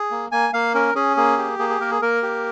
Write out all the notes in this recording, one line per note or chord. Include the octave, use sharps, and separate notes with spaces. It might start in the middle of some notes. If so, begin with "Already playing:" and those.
Already playing: G#4
A#3
A#3 G#5
A#3 F5
C#4 A#4
C#4 G#4
A#3 G#4
G4
A#3 G#4
G#4
A#3 A#4
G#4
A#3 A#4
G4